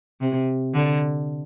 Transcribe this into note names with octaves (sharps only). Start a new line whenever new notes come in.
C3
D3